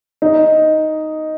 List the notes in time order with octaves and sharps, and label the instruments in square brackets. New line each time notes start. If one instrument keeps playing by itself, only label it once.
[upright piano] D#4